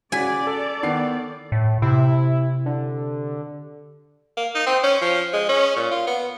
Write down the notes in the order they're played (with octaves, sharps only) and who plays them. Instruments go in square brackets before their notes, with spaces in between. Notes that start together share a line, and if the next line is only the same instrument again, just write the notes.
[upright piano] C#3 F#4 B6 [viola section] D5 [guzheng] G#5
[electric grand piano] A4
[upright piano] D#3 B3 C7
[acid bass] A2
[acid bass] C3 [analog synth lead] E4
[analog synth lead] D3
[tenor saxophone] A#3
D#4
C4
C#4
F3
G#3
C#4
A#2
F4
B3